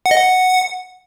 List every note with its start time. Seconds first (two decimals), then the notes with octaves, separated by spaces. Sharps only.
0.06 F#5
0.11 D#5
0.17 F#5